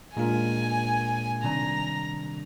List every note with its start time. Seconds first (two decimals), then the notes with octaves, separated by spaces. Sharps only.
0.17 A#2 G#3 D4 F4 A#4 G#5
1.43 C3 D#3 G3 D4 A#5